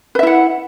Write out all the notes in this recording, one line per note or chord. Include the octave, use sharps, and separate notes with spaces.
E4 B4 E5 F#5